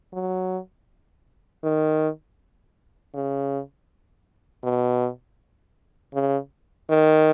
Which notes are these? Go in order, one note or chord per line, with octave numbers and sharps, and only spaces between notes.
F#3
D#3
C#3
B2
C#3
D#3